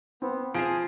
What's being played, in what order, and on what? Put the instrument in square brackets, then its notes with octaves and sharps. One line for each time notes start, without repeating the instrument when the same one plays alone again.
[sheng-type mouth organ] B3 [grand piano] C4
[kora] F3 F5 [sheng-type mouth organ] G#4 G#5 [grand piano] D7